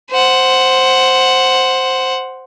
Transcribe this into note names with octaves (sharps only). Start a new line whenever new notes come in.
C5 F#5